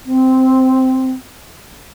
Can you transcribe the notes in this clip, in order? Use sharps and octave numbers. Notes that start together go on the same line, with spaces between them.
C4